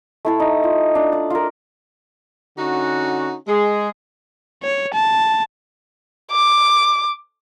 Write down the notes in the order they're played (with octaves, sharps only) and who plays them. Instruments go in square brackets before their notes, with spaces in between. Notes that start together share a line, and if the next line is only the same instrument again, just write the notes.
[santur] A3 E4 A5
D#4
F4
D4
D5
F4 A#4
[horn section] D3 C#4 D#4 F#4
G#3 G#4
[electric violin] C#5
A5
[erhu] D6